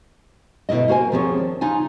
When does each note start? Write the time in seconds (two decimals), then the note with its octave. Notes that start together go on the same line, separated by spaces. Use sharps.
0.69 D2 B2 G#3 E4 D#5
0.88 A#3 F#4 C5 G#5
1.12 D#2 F3 C4 G4 G#4 C#5
1.38 D4
1.61 C#3 D#4 F4 G#5